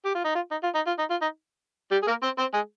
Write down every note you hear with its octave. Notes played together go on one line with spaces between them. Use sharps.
G4
F4
D#4
F4
D#4
F4
D#4
F4
D#4
F4
D#4
G3 G4
G#4
A#3 A#4
C4 C5
C4 C5
G#3 G#4